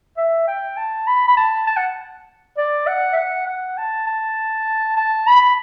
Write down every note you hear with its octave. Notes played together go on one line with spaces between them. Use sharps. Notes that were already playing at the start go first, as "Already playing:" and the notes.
E5
G5
A5
B5
B5
A5
A5
F#5
D5
F#5
E5
F#5
F#5
A5
A5
A5
B5